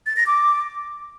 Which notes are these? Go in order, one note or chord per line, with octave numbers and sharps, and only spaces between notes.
A6
A#6
D6